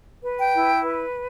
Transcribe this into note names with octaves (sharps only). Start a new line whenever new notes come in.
B4
G5
E4
B4